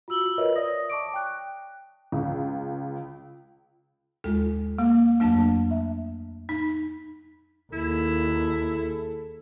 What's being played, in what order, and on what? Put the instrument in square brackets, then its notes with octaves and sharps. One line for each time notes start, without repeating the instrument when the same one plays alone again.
[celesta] F4 F#4 E6 F#7 G7
F4 A#4 B4 C#5 D#5 E5
C#5 D5 E5 D#6 A#6
A5 C#6 D6 D7
G5 F#6
[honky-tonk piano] C#2
[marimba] D#2 G#3 F4 [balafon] A4
[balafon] A#3
[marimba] F2 F#3 A3 [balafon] A#3 D4 A5
[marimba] E5
[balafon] D#4
[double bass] D#2 [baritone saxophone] E4 [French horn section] G#4 A4